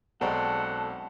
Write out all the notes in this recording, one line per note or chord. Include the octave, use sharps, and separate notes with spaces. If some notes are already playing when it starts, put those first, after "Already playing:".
B1 G#3 C4 C#4 A4 D5 F#5 A#5